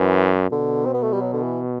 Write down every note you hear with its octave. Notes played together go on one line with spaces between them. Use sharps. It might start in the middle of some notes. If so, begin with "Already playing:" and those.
Already playing: F#2 E3
B2 D3
C4
B3
A3
G3
F#3
D3
E3